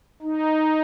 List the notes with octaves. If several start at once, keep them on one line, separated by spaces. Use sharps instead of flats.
D#4